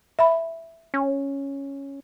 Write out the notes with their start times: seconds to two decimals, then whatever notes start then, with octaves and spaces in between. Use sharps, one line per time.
0.19 E5 B5
0.94 C#4